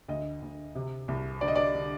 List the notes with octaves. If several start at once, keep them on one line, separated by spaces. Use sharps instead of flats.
D2 D#5
D2
C3
C2
D3 D5
D#5
D5
D3